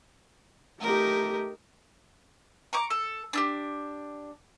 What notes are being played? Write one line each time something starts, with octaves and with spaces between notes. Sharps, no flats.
A3 D#4 G4 A#4
A#5 C#6 D6
A4
D4 E4 G4